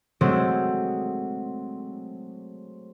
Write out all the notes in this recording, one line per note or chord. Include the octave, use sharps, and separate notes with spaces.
F#3 G#3 A3 C4